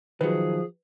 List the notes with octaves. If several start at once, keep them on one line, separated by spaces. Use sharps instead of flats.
D#3 F3 F#3 G#4 B4